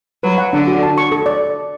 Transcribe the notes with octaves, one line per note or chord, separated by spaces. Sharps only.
F#3 B4
F#5
D3 D4
F#4
A5
C#6
A4
D5